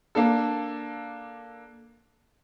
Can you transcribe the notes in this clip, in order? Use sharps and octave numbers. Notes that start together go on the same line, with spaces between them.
A#3 D4 A4